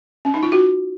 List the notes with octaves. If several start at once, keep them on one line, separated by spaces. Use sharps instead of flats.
C#4
D#4
F4
F#4